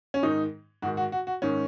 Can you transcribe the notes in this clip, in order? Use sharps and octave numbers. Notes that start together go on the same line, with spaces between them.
C#4
G#2 D#3 D#4
G#2 D#3 F#4
F#4
F#4
F#4
G#2 D#3 C#4